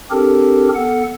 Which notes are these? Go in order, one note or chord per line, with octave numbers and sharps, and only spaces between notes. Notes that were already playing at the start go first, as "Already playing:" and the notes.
C4 D4 G4 A4 A#4
B3 A4 F#5